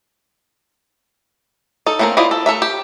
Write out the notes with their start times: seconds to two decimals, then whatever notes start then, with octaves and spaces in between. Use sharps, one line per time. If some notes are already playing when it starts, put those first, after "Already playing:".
1.86 D#4 A4
1.99 A3 A#3 C4 C#4 A#4
2.17 E4 F4 C5 D5 D#5
2.31 A4
2.46 A3 A4 A#4 E5
2.62 G4